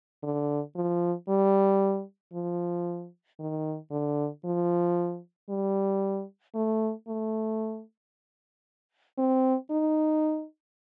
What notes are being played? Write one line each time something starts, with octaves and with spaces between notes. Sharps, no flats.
D3
F3
G3
F3
D#3
D3
F3
G3
A3
A3
C4
D#4